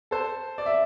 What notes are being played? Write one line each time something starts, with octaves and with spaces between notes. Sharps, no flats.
A4 C5
D5
E5